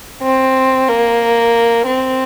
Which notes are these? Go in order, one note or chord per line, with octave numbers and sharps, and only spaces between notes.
C4
A#3
C4